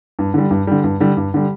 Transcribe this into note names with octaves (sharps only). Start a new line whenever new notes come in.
G2
D3 G3
G2
D3 G3
G2
D3 G3
G2
D3 G3